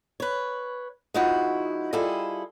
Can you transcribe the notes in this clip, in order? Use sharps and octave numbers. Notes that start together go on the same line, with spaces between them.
B4 C#5
F3 G#3 D#4 E4 F#4
G3 E4 F4 G#4 A4 D#5